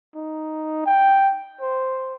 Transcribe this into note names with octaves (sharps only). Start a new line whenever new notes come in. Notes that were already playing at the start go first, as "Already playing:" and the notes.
D#4
G5
C5